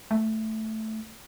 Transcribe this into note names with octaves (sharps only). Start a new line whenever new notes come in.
A3